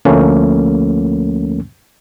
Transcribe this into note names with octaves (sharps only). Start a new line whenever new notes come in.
D2 F3 A3 A#3 C#4